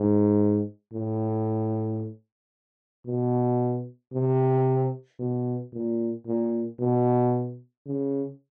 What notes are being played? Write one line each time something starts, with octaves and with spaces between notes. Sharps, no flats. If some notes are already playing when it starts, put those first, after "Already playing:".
Already playing: G#2
A2
B2
C3
B2
A#2
A#2
B2
C#3